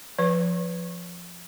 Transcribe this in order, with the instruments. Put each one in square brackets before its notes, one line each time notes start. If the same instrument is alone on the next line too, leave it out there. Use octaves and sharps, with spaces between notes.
[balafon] F3 B4